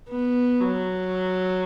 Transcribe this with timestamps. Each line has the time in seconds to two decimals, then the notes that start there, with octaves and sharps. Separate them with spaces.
0.09 B3
0.61 F#3